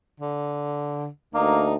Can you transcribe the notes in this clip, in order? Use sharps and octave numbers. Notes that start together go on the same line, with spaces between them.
D3
D2 A#3 D#4